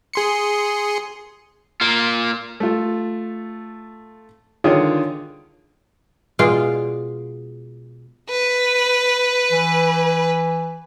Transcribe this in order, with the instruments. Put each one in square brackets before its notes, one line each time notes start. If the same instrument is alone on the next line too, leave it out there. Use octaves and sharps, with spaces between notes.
[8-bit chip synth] G#4 C6 C#7
[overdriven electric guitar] A#3 F4
[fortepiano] A3 F4
D3 D#3 F4 G#4 C#5 D#6
[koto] B2 G#3 F4 D5 F5
[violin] B4
[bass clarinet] E3